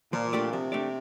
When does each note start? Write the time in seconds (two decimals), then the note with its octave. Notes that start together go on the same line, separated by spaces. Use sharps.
0.13 A#2 F3
0.33 A3 D4 G4 D5
0.52 C3 F3
0.72 A3 D4 G4 D5